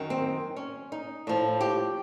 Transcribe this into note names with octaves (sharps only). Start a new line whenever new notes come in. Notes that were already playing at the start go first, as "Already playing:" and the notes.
Already playing: F#2 D#3
C4
C#4
D#4
A2 F3
G4